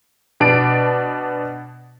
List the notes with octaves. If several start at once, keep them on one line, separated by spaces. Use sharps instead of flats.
B2 D4 D7